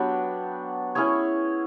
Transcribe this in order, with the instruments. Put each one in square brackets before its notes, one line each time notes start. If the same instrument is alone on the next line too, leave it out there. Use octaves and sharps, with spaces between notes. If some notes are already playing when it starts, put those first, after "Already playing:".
Already playing: [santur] F#3 B3 D4 G4
C#4 E4 G#4 C#5